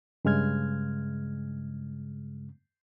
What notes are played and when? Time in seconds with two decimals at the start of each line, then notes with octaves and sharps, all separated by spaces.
0.25 G2 C#3 G#3 F6 G#6